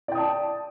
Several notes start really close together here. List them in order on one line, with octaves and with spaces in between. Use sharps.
D5 G5 D#6 A5